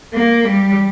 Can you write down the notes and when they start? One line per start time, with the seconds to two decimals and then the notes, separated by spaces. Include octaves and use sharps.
0.13 A#3
0.45 G3